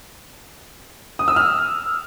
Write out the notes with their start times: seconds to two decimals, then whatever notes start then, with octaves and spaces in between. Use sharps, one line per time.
1.19 D#6
1.28 E6
1.36 F6